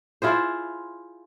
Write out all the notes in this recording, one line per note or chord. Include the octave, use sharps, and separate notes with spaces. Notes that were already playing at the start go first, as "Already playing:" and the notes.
E4 F4 G#4 C5